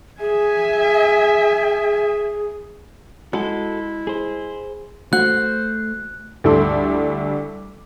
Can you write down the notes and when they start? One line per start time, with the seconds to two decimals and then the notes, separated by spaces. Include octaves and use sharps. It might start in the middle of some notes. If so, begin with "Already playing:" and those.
0.20 G#4 E5 G#5
3.33 G#3 E4 F#4 A4
4.07 G#4 C5
5.13 A3 F#4 C5 F#6
6.44 D2 G3 E4 A4 C6 D6